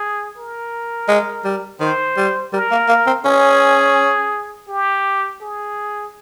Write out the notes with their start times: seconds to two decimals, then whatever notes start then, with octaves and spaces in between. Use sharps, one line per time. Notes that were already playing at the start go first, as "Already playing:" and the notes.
Already playing: G#4
0.37 A#4
1.08 G#3
1.44 G3
1.80 D#3 C5
2.17 G3
2.53 G3 A#4
2.71 A#3
2.89 A#3
3.07 C4
3.25 C#4 G#4
4.69 G4
5.42 G#4